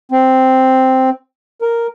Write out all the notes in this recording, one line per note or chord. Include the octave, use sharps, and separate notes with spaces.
C4
A#4